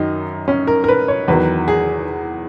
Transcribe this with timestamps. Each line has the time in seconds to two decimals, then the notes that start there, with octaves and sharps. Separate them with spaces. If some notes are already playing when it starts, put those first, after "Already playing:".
Already playing: F#2 D#3 F#3 D#4
0.48 C#4
0.67 A#4
0.84 A#4
0.88 B4
1.08 C#5
1.28 E2 D#3 F#3 B4
1.68 G#4